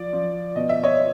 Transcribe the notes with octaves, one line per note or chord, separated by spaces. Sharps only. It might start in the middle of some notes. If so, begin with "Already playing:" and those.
Already playing: F3 D5
F3
B2 D#5
E5
C#5 D#5